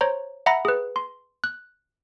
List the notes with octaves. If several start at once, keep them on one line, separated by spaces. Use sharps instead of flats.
C5 C#5 A#5
E5 F#5 A#5 B5 A#6
G#4 B4
C6
F#6